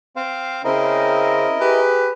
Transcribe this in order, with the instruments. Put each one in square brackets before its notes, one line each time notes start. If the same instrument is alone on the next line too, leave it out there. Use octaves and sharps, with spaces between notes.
[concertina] C4 C5 F5
[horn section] C#3 C4 [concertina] E4 A#4 D#5
[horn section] G4 G#4 B4